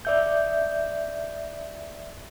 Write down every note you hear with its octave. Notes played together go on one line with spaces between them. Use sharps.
D5 E5 G6